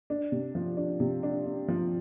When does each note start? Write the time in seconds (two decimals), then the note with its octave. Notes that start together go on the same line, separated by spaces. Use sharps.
0.10 D4
0.32 C3
0.55 F3
0.77 D4
1.00 C3
1.23 D4
1.46 D4
1.68 F3